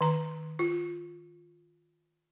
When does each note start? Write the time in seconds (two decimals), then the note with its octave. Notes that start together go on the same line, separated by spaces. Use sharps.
0.01 D#3 A#5
0.59 F4